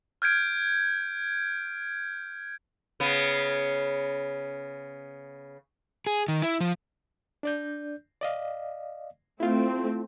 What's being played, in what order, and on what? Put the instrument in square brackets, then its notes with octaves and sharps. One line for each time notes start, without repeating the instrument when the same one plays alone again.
[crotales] F6 G6 G#6 D7
[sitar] C#3 B3
[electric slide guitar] G#4
D#3
E4
F3
[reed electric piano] D4 D5 G6
D5 D#5 F5
[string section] A3 C4 [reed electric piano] E4 F4